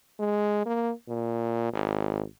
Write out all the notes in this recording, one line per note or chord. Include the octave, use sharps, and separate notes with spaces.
G#3
A#3
A#2
G#1